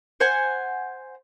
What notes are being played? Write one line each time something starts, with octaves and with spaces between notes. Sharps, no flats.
C5 F#5 G#5